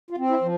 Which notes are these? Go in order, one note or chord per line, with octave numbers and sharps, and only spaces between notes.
F4
C4
E4
F3